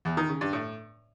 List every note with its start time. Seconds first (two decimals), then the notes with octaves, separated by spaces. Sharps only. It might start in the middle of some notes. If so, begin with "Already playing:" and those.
0.05 E2
0.17 D#3
0.29 C#3
0.41 G2
0.53 A2